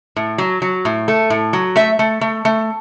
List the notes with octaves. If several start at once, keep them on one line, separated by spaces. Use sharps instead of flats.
A2
F#3
F#3
A2
A3
A2
F#3
A3 E5
A3
A3
A3